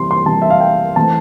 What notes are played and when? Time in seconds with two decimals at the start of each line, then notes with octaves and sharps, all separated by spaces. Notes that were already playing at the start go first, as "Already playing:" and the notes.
Already playing: C3 E3 G3 C6
0.11 C6
0.26 C3 E3 G3 A5
0.42 E5
0.50 F5
0.60 G5
0.96 E3 A3 C4 A5